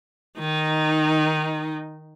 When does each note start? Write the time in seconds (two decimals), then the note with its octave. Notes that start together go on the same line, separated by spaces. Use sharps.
0.38 D#3 D#4